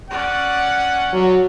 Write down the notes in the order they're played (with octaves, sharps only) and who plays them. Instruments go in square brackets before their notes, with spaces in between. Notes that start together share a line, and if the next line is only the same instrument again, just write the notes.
[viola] C#4 D5 [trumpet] F#5
[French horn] F#3